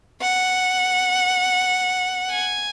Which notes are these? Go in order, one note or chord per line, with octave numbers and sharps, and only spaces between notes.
F#5
G#5